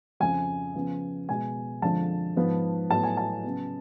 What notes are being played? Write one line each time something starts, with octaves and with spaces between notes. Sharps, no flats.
F2 C#3 F3 G#5
C#3 F3 B3
B2 G#3 B3 G#5
F2 D3 F3 G#3 A5
G#2 F3 B3
A2 F#3 B3 A5
G#5
A5
C#3 F#3 B3